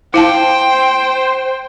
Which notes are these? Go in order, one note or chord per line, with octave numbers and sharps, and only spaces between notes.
E4 C5 F5 G5 A5